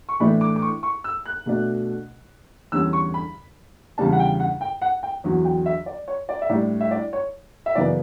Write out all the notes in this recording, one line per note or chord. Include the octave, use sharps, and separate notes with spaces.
C#6
A2 E3 A3 D4 B5
D6
D6
C#6
C#6
E6
F#6
B2 A3 D4
E2 D3 G3 C#4 E6
C#6
B5
E2 C#3 G3 D4 A5
F#5
G5
F#5
G5
F#5
G5
E2 D3 F#3
G5
E5
D5
C#5
D5
E5
A2 G3 D4 D5
E5
D5
C#5
E5
F#2 C#3 E3 B3 D5